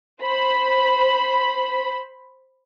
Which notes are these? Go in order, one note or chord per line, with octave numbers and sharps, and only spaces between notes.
C5 B5